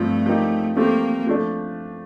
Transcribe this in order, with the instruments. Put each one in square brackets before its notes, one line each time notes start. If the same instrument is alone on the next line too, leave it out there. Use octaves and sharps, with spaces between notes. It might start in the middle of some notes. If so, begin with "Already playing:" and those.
Already playing: [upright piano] G2 F3 C4 [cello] A3
[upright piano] F3 A#3 D#4 G4
[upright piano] F3 A3 C4 G4 [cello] A#3
[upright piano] F3 A3 D4